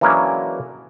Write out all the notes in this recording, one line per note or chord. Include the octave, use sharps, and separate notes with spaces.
E3 F#3 G#3 A#3 C#4 D4